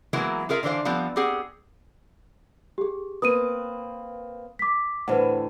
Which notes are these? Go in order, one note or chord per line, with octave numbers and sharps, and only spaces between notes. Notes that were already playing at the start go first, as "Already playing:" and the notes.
E3 F#3 G#3 A#3 B3 E4
F4 G#4 A#4 E5
D3 E3 D4 C5 F5
F3 G3 B3 C4
C4 G4 G#4 F#5
G4 G#4
A#3 C4 B4 D#6 D#7
D6 B6
A2 D3 E3 B4 C5 F#5